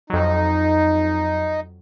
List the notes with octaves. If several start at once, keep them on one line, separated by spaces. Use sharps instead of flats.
F2 F#3 D#4